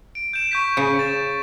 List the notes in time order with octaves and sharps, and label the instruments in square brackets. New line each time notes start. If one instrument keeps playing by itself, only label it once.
[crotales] D7
G6 E7
C#6 G6 B6
[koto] C#3
[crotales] A6 E7